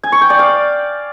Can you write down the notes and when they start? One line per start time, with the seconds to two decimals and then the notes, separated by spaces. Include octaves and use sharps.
0.03 G#5
0.12 C#6
0.21 G5
0.30 D5
0.39 F5